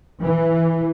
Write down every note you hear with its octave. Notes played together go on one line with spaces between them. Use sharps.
E3